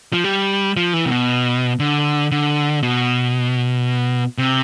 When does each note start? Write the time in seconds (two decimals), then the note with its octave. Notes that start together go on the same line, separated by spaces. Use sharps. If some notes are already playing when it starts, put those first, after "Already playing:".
0.13 F3
0.24 G3
0.77 F3
0.94 E3
1.06 C3
1.10 B2
1.80 D3
2.32 D3
2.83 B2
4.38 C3